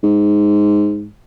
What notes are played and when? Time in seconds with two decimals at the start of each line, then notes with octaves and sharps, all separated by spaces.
0.04 G#2